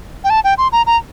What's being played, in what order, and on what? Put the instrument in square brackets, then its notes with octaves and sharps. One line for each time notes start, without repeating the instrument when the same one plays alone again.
[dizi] G5
A5
G5
C6
A#5
A#5